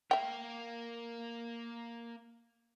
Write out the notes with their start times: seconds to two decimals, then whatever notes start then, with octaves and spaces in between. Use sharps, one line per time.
0.11 A#3 A#4 E5 G5